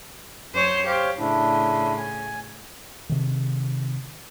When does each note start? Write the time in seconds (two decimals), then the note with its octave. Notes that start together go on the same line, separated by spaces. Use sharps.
0.53 F#2 C5 C#5
0.87 G4 C5 C#5 F5
1.18 A2 C#3 D4 E4
1.97 G#5
3.09 C3 D#3